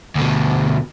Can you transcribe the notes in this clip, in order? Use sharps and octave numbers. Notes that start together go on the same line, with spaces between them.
D2 B2